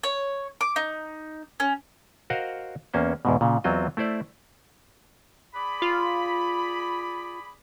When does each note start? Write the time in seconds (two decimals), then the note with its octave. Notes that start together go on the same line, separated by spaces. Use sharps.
0.03 C#5
0.61 D6
0.76 D#4
1.60 C#4
2.30 F#4 A#4 C5 D#5 F5 F#5
2.94 E2 A#3 C#4 C5
3.25 E2 G#2 B2
3.41 A#2 C#3
3.64 E2 F#3 C4 F4 D#5
3.97 A3 E4 C5 D5
5.55 G#4 D5 B5
5.82 F4